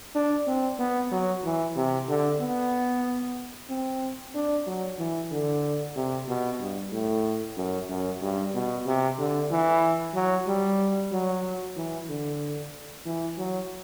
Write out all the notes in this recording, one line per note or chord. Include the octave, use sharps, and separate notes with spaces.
D4
C4
B3
F#3
E3
C3
D3
B3
C4
D4
F#3
E3
D3
C3
B2
G2
A2
F#2
F#2
G2
B2
C3
D3
E3
F#3
G3
F#3
E3
D3
E3
F#3